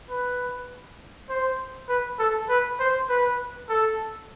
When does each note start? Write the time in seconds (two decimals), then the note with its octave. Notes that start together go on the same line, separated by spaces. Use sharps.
0.10 B4
1.29 C5
1.89 B4
2.19 A4
2.49 B4
2.79 C5
3.09 B4
3.69 A4